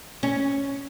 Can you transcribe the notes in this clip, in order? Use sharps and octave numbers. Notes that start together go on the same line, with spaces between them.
C#4